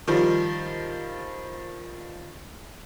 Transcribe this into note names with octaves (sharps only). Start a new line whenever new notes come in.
D#3 F3 G3